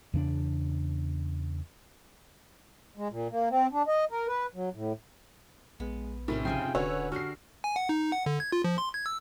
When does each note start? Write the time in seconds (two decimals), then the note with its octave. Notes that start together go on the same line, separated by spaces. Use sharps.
0.14 E2 C#3 A#3 D4
2.97 G#3
3.11 A#2
3.30 A#3
3.50 C4
3.72 D4
3.88 D#5
4.11 A#4
4.27 B4
4.55 F#3
4.74 A2
5.80 A#1 G#3 B3
6.28 A2 C3 C#4 D#4 A#4
6.45 F2 C#3 G#4 G5 G#5 C6
6.75 D#1 D3 C#4 F#4 B4 C#5 E6
7.12 D4 F#4 G4 A#4 F6 C7
7.64 G#5
7.76 F#5
7.89 D#4
8.12 F#5
8.26 D3
8.40 G#6
8.52 F4
8.64 F3
8.78 C6
8.94 G#6
9.06 E6